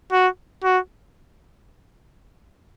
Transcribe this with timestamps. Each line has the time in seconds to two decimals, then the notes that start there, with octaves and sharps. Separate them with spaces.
0.12 F#4
0.64 F#4